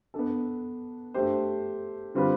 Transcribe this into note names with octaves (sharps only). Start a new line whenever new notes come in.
B3 D4 A4
A3 D4 G4 C5
D3 G3 C4 F4 B4